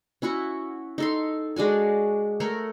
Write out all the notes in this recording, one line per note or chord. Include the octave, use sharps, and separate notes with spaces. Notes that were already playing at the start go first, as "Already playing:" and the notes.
C#4 E4 F#4 C#6
D#4 A4 C6
G#3 D4 F#4 G#5
A3 A#4 C#5